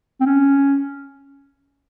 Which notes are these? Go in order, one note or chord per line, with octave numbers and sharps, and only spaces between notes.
C4
C#4